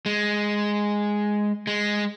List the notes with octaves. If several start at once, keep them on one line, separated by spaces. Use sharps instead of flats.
G#3
G#3